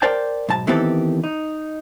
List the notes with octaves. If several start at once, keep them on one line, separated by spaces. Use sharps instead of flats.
A#4 C5 D5 G5 A5
B1 G#2 A5
D#3 E3 B3 C4 G4 A4
D#4